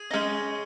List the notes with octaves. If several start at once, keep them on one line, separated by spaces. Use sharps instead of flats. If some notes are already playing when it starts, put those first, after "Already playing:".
Already playing: G#4
D#4
G#3 C#4